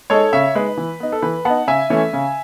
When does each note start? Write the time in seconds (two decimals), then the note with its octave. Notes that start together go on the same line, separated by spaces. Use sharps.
0.10 G#3 D#4 A4 C#5
0.33 C#3 C#5 E5
0.55 G#3 D#4 B4
0.77 E3
1.00 B3 D#4
1.12 A4
1.22 E3 B4
1.45 B3 D#4 F#5 A5
1.67 C#3 E5 G#5
1.90 E3 A3 C#4
2.13 C#3